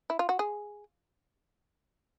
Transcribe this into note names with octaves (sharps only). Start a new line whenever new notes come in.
E4
F4
F#4
G#4